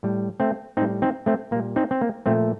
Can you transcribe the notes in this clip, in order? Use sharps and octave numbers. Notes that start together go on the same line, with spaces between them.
A2 G3
A3 C4
A2 G3 C4 D#4
C4 D#4
A3 C4
A#2 G3 A#3
C4 D#4
C4
A#3
A#2 F3 A3 C4